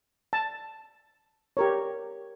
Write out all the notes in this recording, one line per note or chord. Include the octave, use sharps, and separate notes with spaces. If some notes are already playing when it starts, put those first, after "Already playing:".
A5
G4 A#4 C#5